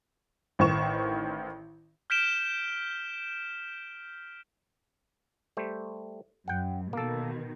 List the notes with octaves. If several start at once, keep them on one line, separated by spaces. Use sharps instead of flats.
A1 D#3 C5 C#6 E7
F6 G6 B6 D7 E7 G7
G3 A3 C5
F#2 F#5 G5
B2 D#3 A#3 A4